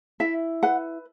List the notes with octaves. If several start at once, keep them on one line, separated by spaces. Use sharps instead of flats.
E4 E5
B4 F#5